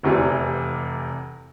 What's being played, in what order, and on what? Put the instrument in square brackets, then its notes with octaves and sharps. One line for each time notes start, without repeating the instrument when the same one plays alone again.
[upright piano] F1 E2 C3 E3